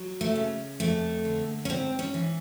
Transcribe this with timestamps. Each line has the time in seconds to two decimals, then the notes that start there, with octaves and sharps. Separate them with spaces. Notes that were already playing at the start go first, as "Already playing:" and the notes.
Already playing: F#3
0.21 A3
0.35 C#3
0.80 F2 A3
1.25 D3
1.65 C#4
1.69 G#2 C4
1.99 C#4
2.14 E3